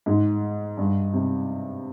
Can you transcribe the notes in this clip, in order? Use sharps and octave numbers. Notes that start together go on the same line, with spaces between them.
G#2
G2
C3